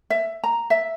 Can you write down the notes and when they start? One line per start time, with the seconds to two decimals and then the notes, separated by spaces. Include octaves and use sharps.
0.10 E5
0.44 A#5
0.70 E5